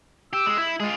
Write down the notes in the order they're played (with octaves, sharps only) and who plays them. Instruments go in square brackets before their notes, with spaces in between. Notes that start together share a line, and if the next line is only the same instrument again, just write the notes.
[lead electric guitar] G4 [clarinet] E6
[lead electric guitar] G#3
E4
[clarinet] G#3 [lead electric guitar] F4 G#4